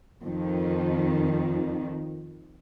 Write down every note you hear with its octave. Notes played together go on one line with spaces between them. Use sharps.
F2 D#3